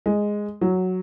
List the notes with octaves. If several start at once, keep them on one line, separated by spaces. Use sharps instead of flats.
G#3
F#3